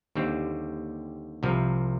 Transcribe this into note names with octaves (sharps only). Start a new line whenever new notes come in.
D#2 D3 G3 C4 G4
C2 C3 F3